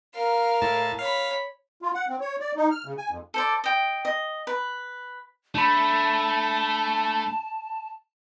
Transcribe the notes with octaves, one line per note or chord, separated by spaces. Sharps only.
A#4 F5
A2 A5
C#5 F5 B5
F4
F#5
C4
C#5
D5
D#4
F6
C#3
G#5
F2
A4 C5 D5
D#5 G5
D#5
B4
A3 D4 A5 B5